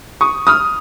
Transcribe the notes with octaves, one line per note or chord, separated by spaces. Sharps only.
C#6 D#6
D#6 F6